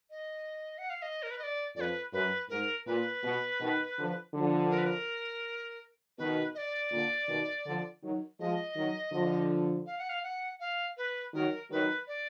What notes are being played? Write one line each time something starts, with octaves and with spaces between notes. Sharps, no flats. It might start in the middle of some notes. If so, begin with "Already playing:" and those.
D#5
F#5
F5
D#5
A#4
B4
D#5
D5
F2 B4 D5
F#2 B4
G#2 A#4
A#2 B4
B2
B2 D#3
D3 F3
D3 F3
A#4
B4
A#4
B2 D#3 B4
D#5
D5
A#2 D3
B2 D#3
D3 F3
D#3 F#3
F3 G#3 D#5
D#3 F#3
D3 F3
F5
F#5
F5
F#5
F5
B4
D#3 F#3 A#4
D#3 F#3 B4
D5